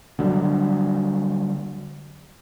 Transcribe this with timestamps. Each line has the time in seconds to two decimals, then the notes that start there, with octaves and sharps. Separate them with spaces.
0.19 D3 F#3 G3